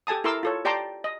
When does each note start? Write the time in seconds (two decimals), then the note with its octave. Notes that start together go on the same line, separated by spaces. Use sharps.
0.07 G4 A4 G#5 A5 D#6
0.24 E4 A4 A#4 C6 D6 E6
0.43 F4 A4 C#5
0.65 G4 D5 G5 A5 A#5 C6
1.04 D#5